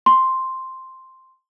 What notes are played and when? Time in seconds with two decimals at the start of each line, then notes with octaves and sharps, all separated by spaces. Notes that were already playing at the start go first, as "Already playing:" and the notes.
0.06 C6